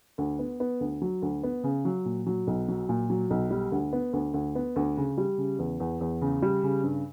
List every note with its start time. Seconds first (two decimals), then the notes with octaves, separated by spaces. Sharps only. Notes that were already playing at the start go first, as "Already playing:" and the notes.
0.18 D2
0.39 B3
0.60 B3
0.81 D2
1.02 F#3
1.22 D2
1.43 B3
1.64 C#3
1.85 F#3
2.05 A#2
2.26 F#3
2.47 B1
2.68 F#3
2.89 A#2
3.10 F#3
3.30 B1
3.51 G3
3.72 D2
3.93 B3
4.13 D2
4.34 D2
4.55 B3
4.76 D2
4.97 C#3
5.18 G3
5.38 C#3
5.59 E2
5.80 E2
6.01 E2
6.21 C#3
6.42 G3
6.63 C#3
6.83 G2